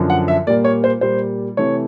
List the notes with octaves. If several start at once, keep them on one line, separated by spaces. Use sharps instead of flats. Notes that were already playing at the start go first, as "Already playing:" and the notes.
Already playing: F#2 D3 F3
F#5
E5
A#2 G3 A#3 D5
C#5
C5
A#2 G3 A#3 C5
C3 E3 A3 C#5